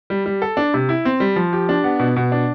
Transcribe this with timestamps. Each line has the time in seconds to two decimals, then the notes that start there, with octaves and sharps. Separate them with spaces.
0.10 G3
0.26 G3
0.42 A4
0.57 D4
0.74 C3
0.89 E4
1.05 C4
1.20 G3
1.36 F3
1.53 G4
1.69 D4
1.84 B3
1.99 B2
2.16 B2
2.32 D4